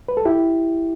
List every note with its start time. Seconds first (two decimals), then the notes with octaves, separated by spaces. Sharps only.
0.08 B4
0.17 A4
0.25 E4 G4